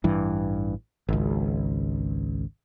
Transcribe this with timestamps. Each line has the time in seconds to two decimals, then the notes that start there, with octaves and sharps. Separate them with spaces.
0.04 A1 G2 E3
1.09 G#1 C#2